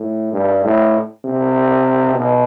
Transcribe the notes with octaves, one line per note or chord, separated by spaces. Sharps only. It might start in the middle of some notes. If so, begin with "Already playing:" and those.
Already playing: A2
G2
A2
C3
B2